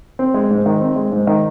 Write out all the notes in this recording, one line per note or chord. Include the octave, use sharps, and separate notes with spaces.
C4
G#3
G#2
D#3
C4
G#3
G#2
D#3